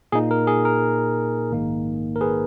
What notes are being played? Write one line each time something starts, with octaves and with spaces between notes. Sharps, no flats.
A#2 A#3 D#4 G#4
A#4
G#4
A#4
A#1 G#2 D#3 A#3 D#4
A#4
G#4 B4